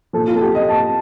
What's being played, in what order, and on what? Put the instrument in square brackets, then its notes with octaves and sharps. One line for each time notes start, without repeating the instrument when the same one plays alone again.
[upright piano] A#2 F3 A4
F4
A4
G4
D#5
A5